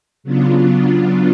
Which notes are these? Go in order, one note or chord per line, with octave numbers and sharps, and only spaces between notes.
C#3 F#3 B3 D4 F4